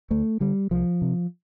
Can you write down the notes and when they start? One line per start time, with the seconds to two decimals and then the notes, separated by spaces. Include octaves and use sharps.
0.10 D2 A3
0.40 D3 G3
0.71 C2 F3
1.02 C3